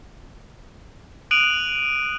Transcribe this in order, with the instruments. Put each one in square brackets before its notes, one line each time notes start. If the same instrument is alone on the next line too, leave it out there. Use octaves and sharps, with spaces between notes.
[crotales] D#6 F#6 D7 D#7 F7 F#7